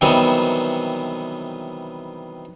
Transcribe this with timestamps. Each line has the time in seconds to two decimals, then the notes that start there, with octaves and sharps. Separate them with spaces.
0.01 C3 D#3 E3 F#3 G3 B3